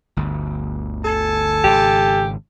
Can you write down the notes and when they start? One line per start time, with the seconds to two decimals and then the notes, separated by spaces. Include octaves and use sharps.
0.17 G1 D2
1.04 A4 G#5 A5
1.64 G#1 C#3 G4